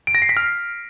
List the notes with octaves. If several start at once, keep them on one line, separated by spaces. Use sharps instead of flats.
D7
A#6
C7
B6
F6